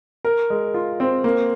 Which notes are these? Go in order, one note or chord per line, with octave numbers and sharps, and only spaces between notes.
A#4
G#3
F4
C4
A#3